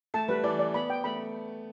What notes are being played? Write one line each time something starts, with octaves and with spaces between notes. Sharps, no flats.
A3 A5
G3 B4
E3 D5
D5
B3 B5
G5
A3 B5